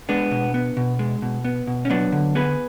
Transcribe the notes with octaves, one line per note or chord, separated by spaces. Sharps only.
G#3 B3 D4
B2
B3
B2
G#3
B2
B3
B2
C#4
F#3 B3 D4
D3
B3 G#4 B4